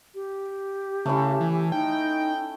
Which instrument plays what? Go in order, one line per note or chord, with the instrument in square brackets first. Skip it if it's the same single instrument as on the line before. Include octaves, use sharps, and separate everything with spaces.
[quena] G4
[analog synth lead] C#3 [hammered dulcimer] A3 C#4 E4
[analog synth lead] E3
[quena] D#4 [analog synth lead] G5